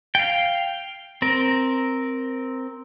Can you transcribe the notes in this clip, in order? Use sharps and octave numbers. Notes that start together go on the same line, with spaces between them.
F5 G5
C4 A#4